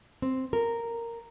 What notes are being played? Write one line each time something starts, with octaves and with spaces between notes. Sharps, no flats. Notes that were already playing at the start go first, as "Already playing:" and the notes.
C4
A#4